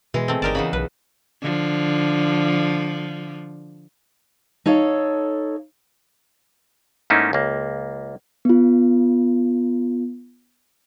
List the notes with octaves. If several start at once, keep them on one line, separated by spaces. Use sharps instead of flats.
B2 E3 G#3
A3 C4
G1 D#4 G4 A#4 D5 A5
E2 C#3 B3 B5
B1 B4
D3 F3
D#4 A4 C#5 F5
G#2 A3 A#3 C#4 D#4 E4
C#2 A#3
B3 F4